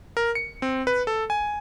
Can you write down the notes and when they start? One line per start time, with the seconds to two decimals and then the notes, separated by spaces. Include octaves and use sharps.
0.17 A#4
0.35 C#7
0.62 C4
0.87 B4
1.07 A4
1.30 G#5